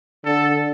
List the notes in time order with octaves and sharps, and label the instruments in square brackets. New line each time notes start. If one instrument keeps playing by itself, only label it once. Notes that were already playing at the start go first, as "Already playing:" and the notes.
[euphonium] D3 [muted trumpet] A4